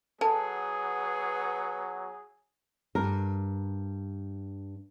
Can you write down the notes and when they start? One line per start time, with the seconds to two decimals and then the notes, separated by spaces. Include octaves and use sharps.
0.21 F#3 B3 G#4 A4 G#5 A5
2.95 G2 A#4